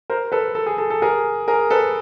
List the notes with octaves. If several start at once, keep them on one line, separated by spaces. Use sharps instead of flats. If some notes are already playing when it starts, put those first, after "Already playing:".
A#4 C5
A4 B4
A4
G#4
A4
A4
G#4 A#4
G#4 A#4
A4 B4